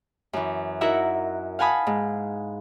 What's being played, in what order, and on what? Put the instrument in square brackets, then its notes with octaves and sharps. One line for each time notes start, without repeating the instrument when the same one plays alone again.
[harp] F#2 E3
D#4 E4 F#4 A#4 E5 F#5
F5 F#5 G#5 A5 B5 D#6
G#2